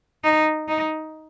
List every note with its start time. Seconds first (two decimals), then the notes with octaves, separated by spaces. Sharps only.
0.24 D#4
0.68 D#4